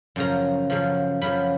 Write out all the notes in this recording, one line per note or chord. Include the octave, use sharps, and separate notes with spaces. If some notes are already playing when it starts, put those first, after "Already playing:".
F#2 C#3 F3 A#5
F#2 C#3 F3
F#2 C#3 F3 B5